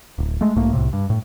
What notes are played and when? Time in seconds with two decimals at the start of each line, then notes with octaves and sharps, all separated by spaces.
0.18 D1
0.41 G#3 A3
0.56 B1 G#2 A3 A#3
0.73 C2 A2 C3
0.93 G2
1.10 A2